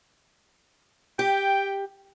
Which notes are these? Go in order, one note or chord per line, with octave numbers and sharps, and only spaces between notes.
G4 G5